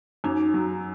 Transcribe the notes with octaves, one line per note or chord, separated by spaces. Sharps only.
F#2 D#4
F#3